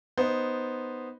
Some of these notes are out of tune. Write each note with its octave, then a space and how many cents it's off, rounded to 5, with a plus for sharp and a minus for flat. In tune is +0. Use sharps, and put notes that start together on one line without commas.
B3 +0 D#4 +0 C5 +0